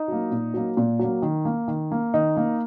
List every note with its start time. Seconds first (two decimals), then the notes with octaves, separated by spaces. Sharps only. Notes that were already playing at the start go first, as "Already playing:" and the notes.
Already playing: D#4
0.08 F#3 A#3
0.31 A#2
0.54 F#3 A#3
0.77 A#2
0.99 F#3 A#3
1.22 D#3
1.45 A#3
1.68 D#3
1.92 A#3
2.14 D#3 D#4
2.37 A#3